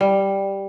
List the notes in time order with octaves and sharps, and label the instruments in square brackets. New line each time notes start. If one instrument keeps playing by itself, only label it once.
[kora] G3